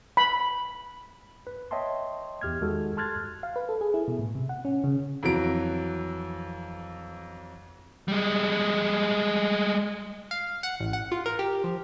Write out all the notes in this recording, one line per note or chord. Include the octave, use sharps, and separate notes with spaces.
B5
B4
C#5 D#5 E5 G5 A5 C6
E2 G4 F6 G#6
D#3 G#3 F#4 G4 A4
A5 C6 F6 F#6 G#6 A6
F5
B4
A4
G#4
E4
B2
A2
C3
F#5
C#4
C#3
F2 E3 F#3 D7
G3 G#3
F5
F#5
A1
F#5
F4
A#4
G4
F3